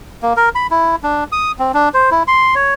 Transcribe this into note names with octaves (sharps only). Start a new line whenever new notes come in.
A#3
A#4
B5
E4
D4
D#6
C4
D4
C5
E4
C6
C#5